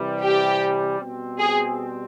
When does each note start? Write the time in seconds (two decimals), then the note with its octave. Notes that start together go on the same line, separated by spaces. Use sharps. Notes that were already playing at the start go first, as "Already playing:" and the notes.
Already playing: C3 E3 G3
0.21 G4
0.99 B2 G3 C4
1.39 G#4